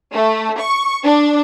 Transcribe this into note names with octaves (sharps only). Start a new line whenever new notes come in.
A3
C#6
D4